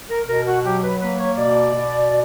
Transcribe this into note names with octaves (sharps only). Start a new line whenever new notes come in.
A#4
B2 A#4
F#4
F#3 G4
B4
A#3 B4
C#5
B2 D5
B2